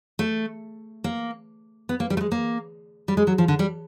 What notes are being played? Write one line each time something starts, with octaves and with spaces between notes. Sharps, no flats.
A3
A#3
B3
A#3
G3
A3
G#3
A#3
G3
G#3
F#3
F3
D3
G3